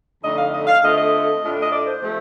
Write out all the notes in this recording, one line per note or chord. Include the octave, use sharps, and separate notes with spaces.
F2 D3 A3 D#4 D#5
F5
D#5
F5
D3 A3 C4 F4 D#5
D#5
A2 A3 D4 F4
D#5
D5
C5
C3 F3 A3 C4